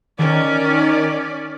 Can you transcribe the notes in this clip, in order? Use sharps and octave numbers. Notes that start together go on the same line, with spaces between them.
D#3 C#4 D5